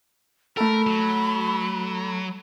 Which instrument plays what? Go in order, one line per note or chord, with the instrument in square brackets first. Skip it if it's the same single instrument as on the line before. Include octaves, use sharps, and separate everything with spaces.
[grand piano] A3 A4 [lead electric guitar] A#4 [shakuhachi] B5
[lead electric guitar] F#3